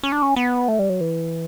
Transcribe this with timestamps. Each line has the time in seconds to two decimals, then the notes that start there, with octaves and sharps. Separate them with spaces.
0.03 C#4
0.12 D4
0.22 C#4
0.36 B3
0.68 A3
0.79 G3
0.89 F#3
1.01 E3